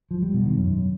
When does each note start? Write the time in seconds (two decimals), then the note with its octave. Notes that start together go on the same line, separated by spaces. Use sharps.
0.11 F3
0.22 G3
0.34 B2
0.46 D#3
0.58 F#2